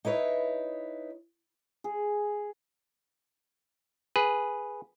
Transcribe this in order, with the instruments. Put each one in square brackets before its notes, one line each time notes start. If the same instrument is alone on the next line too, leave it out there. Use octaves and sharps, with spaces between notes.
[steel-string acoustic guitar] D#4 E4 B4 C#5
[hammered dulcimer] G#4
[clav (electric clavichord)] G#4 B4